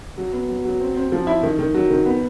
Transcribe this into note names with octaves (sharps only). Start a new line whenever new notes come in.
F#3
B3
F#3
F#3
C4
C4
F3
E4
D#3
D#3
F#3
D#3
B3